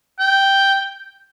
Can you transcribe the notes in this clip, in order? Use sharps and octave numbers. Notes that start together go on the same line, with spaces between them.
G5